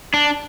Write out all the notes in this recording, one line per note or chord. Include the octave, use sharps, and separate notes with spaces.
D4